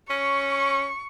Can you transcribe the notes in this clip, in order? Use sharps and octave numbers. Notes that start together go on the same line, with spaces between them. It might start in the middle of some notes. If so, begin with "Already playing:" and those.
C#4 C#6